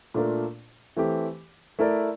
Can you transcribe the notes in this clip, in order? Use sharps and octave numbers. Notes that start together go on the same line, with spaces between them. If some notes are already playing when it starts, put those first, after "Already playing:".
A#2 A3 D4 F4 A#4
E3 A3 C4 G4
A3 E4 A#4 D5